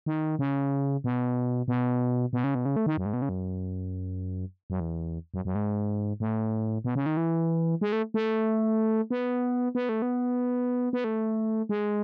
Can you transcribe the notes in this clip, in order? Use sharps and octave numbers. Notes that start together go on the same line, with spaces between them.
D#3
C#3
B2
B2
B2
C#3
B2
C#3
A3
D#3
F#2
G#2
B2
C#3
F#2
F#2
E2
F#2
F#2
G#2
A2
B2
C#3
D#3
E3
G#3
A3
A3
B3
B3
A3
B3
B3
A3
G#3